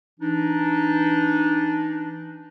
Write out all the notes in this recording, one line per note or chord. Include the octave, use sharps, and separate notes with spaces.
E3 D4 D#4